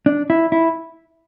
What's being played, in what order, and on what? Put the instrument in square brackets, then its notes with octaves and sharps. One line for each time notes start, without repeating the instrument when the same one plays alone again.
[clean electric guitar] D4
E4
E4